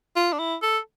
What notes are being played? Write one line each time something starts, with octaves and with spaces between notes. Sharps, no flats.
F4
D4
E4
A4